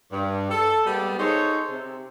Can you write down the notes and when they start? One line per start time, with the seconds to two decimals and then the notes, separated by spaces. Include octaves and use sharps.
0.12 G2
0.51 A4
0.87 G3 G#3 A#3 B3
1.19 D#4 G#4 A4 C5 C#5
1.71 C3